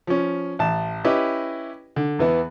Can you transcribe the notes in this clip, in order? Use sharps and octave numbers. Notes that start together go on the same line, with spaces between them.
F3 C#4
A1 A5
C#4 E4 G4 B4 D#5
D3
E2 E3 B3